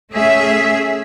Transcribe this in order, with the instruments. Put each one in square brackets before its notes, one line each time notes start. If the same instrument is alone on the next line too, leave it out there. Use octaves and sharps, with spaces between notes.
[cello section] A3 C#4 G#4 E5